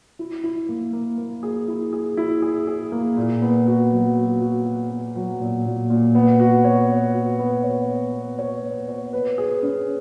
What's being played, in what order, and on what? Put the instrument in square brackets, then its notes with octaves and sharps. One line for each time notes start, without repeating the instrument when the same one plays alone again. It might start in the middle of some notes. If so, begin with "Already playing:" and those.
[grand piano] E4
E4
A#3
A#3
A#3
G#4
E4
G#4
E4
G#4
G#4
A#3
A#2
B3
F#4
F#3
F#4
F#4
F#4
B3
F#3
A#2
A#2
A#2
B3
F#4
C#5
B3
F#4
B3
C#5
B3
B3
C#5
B3
C#5
B4
G#4
C#4